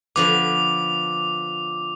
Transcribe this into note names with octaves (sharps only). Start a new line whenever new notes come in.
D3 F3 B3 D6